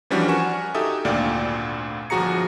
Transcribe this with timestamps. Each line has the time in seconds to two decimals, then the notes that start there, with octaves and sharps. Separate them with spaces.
0.10 E3 F3 G3 C#4 D4 F#4
0.28 A#4 F#5 G#5 C#6 E7
0.75 D#4 F#4 G4 A4 E5 D#6
1.04 G#1 D2 A#2 D5 F5 G5
2.10 G1 F3 F#4 G#4 A#5 C#7